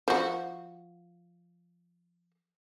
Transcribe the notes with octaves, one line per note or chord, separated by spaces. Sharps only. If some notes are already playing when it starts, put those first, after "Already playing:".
F3 F#4